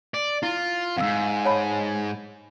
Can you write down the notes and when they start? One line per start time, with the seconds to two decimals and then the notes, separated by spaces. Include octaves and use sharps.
0.14 D5
0.43 E4 F4
0.97 F2 G#2 F5 E6
1.45 C#5 A5 B5